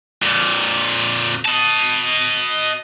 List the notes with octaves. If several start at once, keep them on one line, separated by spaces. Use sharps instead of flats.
F2 A#2
D#5 A5